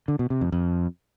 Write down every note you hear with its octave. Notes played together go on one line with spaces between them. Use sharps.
D3
B2
C3
F2
F2